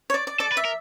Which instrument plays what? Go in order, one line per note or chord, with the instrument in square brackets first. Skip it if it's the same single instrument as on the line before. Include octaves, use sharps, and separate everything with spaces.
[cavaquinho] C#5
D5
D5
[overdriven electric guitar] A4 [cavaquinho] D5
[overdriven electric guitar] B4
[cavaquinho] E5
[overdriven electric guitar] A#4